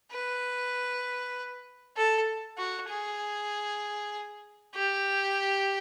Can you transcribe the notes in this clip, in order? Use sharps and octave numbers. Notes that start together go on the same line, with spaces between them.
B4
A4
F#4
G#4
G4